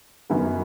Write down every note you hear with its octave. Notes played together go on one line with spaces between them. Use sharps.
F#2 D#3 F#3 B3